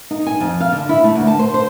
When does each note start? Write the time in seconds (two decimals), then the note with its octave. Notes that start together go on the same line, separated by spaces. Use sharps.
0.11 D#4
0.27 G#5
0.40 F2
0.60 F5
0.72 D3
0.89 E4
1.04 A3
1.15 D2
1.27 A5
1.39 C5
1.54 C5